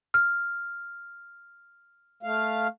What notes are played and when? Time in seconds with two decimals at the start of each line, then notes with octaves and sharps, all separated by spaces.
0.14 F6
2.23 A3 F5